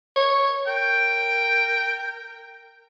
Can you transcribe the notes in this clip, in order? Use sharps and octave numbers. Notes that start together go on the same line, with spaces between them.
C#5
A#4 G5